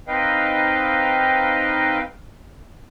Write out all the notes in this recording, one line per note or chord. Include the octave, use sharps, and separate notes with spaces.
C4 D#4 B4 D#5 F5 G5